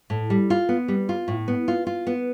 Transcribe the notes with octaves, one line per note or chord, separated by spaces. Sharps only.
A2
G3
F4
B3
G3
F4
A2
B3
F4
F4
B3